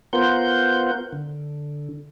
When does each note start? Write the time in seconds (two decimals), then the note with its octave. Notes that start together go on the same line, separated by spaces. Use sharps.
0.13 B3 F4 A#4 C5 F#5 G6
1.13 D3